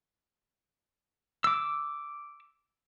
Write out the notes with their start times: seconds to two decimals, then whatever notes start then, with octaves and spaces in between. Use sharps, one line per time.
1.44 D6 E6